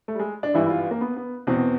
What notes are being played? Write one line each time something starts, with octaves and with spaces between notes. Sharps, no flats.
A3
G3
G#3
D4
G#1 G2 E3 E4
E4
F4
A#3
B3
B3
E2 B2 C4